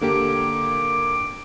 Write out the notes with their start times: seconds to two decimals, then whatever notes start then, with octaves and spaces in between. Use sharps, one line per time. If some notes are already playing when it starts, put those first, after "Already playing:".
0.01 D3 A#3 G4 D6